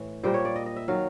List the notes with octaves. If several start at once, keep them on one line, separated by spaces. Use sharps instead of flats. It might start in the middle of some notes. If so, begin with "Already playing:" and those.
Already playing: A2 E3
A#2 G3 A#3 C5
C#5
D5
D#5
D#5
E5
D#3 F#3 F5